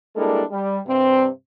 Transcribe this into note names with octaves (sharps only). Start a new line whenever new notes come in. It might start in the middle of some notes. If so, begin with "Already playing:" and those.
G3 G#3 A#3 D4 E4 A4
G3
G2 C3 C4